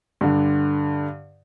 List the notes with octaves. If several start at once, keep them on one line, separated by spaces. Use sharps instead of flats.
G2 D3